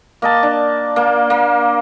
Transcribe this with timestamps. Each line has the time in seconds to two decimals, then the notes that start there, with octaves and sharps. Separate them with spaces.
0.22 A#3 D#5 A5
0.43 D4
0.96 A#3
1.30 A#3